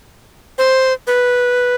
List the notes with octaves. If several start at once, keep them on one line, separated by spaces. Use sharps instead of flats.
C5
B4